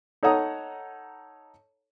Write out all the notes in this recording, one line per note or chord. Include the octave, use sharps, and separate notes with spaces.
D#4 A4 C#5 F#5 A#5 D#6